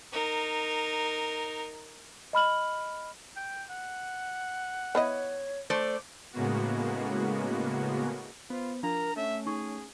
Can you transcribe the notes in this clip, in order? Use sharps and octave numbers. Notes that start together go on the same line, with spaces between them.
D#4 A#4
D#5 B5 F6 F#7
G5
F#5
B3 E4 C#5 D#5
A3 C5 D5
A2 C#3 G#3 A#3 B3 F#4
B3 F4 C5
F3 D4 A#4 A#5
A3 C#4 E5
D#4 G#4 C#6